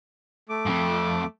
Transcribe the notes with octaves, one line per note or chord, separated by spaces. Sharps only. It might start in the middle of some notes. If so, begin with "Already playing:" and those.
A3 D6
F2 G#2